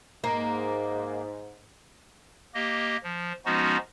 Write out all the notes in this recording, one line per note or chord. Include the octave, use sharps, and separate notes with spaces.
G#2 A#3
A#3 G4 D#5
F3
F3 G#3 B3 C#4 D#4 F#4